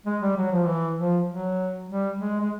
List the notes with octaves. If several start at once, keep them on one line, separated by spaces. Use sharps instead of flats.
G#3
G3
F#3
F3
E3
F3
F#3
G3
G#3
G#3